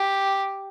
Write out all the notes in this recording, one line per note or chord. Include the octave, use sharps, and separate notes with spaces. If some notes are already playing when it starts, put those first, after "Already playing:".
Already playing: G4